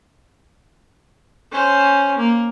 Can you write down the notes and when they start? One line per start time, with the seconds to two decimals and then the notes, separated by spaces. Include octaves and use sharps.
1.52 C#4 C5
2.18 A#3